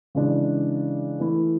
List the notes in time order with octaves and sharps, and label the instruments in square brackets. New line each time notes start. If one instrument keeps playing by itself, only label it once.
[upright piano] C#3 E3 G#3 D4
E3 A3 E4